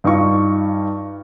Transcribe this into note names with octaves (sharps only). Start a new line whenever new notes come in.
G2 D#4 F4 C#6